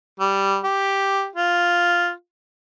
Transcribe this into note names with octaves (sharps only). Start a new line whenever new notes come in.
G3
G4
F4